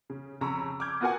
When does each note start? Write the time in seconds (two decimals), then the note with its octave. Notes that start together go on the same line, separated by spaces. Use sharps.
0.10 C#3
0.41 F2 C#3 A#5 B5 C#6 E6
0.80 D6 E6 F6 G6 G#6
1.01 B3 F4 F#4 A#4 F#5 G#5